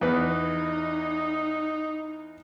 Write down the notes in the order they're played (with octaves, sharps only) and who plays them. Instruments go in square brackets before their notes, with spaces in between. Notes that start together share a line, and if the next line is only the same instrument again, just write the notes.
[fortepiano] E2 B4 [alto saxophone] D#4